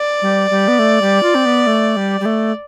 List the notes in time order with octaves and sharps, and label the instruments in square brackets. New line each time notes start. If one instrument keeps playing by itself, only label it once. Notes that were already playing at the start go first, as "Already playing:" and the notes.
Already playing: [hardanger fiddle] D5
[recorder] G3
G3
B3
A3
G3
F4
C4
B3
A3
G3
G3
A3